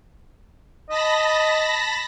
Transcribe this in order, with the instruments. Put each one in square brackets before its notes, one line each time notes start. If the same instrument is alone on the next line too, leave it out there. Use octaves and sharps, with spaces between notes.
[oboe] D#5 [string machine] A5 B5 A#6